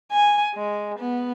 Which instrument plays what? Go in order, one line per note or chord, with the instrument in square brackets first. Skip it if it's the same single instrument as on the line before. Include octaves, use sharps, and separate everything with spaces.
[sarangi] G#5
G#3
B3